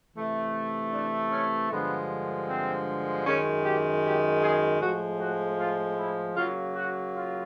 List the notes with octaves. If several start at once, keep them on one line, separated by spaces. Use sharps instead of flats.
C3 E3 A3
D4
C#4
G2 D3 F3 G#3 B3
C4
F#2 D#3 G#3 C#4
G4
G4
G#4
A2 F3 G#3 F#4
F#4
F4
E4
C#3 F#3 A#3 F4
F#4
F4